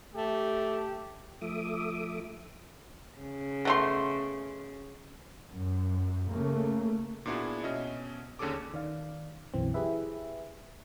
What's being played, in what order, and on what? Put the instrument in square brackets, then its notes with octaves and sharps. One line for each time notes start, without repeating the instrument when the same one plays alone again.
[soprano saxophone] A3 [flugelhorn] G4
[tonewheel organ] F3 A3 E5 D6 D#6
[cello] C#3
[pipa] B2 A3 C6
[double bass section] F#2
C#3 A3 A#3
[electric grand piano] A#2 B3 D4 E4 F#4 G#4
B2 C#4 D#5 E5
D#2 D3 C#4 G#4 A4 D6
[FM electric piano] D#3 D5 F5
B1 F#2 E3 C4
E4 G4 G#4 B4 E5